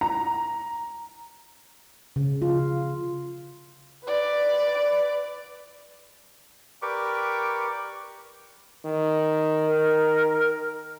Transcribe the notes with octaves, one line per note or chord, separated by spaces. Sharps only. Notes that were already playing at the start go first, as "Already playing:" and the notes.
A#5
C#3
F4
B4 D5
G4 A#4 B4 D5 C#6 D6
D#3
A#4